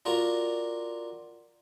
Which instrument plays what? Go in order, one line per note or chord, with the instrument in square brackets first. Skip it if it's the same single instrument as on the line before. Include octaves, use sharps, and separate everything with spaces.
[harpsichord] D4 F4 F#4 A#4